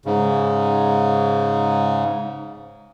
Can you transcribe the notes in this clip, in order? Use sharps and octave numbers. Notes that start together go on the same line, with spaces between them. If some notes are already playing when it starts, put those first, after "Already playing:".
G#2 C#3